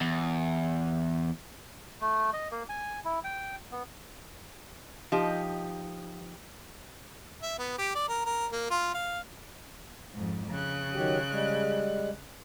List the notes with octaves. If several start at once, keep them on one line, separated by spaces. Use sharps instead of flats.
E2
A3
D#5
A#3
G#5
E4
G5
B3
F3 D#4 G4
E5
B3
G4
D5
A#4
A#4
A#3
F4
F5
F2 G#2
C#3 F#6
D#3 F#3 G4
G3 G#3